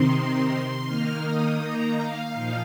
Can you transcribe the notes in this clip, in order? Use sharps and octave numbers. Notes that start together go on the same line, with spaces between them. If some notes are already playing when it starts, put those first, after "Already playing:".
Already playing: C3 D#3 C4 D#4 C6
D#3 A#3 D#4 F6
D#6
A#5
F5
A#2 F3 D#4